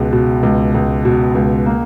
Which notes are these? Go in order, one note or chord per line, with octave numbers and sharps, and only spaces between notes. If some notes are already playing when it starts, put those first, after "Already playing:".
Already playing: C#2 B2 G#3
B2
C#2
C#2
B2
C#2
A#3